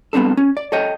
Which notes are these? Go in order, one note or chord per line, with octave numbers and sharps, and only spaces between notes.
G3 B3 C4 D4 A4
C#4
D5
A4 C#5 D#5 G5